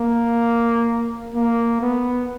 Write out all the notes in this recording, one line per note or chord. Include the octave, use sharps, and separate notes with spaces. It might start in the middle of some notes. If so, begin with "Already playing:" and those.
Already playing: A#3
A#3
B3